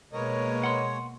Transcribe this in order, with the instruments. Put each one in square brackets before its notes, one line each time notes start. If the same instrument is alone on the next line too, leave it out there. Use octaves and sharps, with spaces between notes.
[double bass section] B2 A#3 [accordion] G#3 C#5 [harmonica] A#4 B4 D#5
[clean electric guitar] F#5 C6